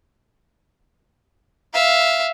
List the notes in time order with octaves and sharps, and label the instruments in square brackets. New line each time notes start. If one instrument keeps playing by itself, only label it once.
[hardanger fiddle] E5 F5